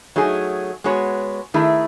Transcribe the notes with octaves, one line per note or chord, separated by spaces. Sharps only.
F#3 A3 D#4 G#4
G#3 B3 F#4 C#5
D#3 A3 E4 G#4